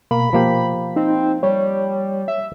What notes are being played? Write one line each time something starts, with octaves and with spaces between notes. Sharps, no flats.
B2 A#3 B5
F3 A#3 G4
C4 D#4
G3 C#5
E5